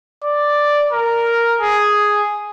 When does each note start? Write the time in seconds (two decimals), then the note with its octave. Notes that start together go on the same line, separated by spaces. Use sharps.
0.24 D5
0.93 A#4
1.61 G#4